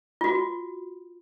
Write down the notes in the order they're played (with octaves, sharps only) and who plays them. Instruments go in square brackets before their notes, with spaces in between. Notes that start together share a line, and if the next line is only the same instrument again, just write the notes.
[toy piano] F4 F#4